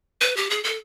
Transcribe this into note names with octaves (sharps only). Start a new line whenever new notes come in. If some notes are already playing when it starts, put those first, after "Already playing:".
B4
G4
G#4
A4